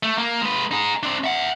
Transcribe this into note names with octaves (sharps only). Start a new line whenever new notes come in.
A3
A#3
G#3 B4
D#4 G#4
C4 D4
E5 F#5